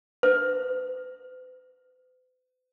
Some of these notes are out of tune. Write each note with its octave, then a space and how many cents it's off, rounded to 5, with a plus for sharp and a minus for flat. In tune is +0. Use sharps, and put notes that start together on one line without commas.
B4 +45